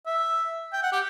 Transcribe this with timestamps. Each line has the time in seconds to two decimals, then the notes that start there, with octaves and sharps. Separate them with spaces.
0.06 E5
0.73 G5
0.83 F#5
0.92 G4